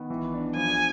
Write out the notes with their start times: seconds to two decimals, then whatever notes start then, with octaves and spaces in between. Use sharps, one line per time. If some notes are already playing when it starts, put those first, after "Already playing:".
Already playing: D#3 B3
0.10 E3
0.34 D4
0.56 F3 G#5